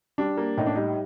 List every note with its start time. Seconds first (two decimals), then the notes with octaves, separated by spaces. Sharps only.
0.18 G3 D4
0.37 A#3
0.57 A2 D#4
0.66 D4
0.75 G3 D#4